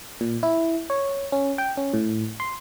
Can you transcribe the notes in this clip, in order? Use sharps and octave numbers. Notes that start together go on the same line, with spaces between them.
A#2
E4
C#5
C#4
G5
C#4
A2
C6